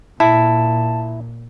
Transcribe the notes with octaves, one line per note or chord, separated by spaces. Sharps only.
A#2 E4 A5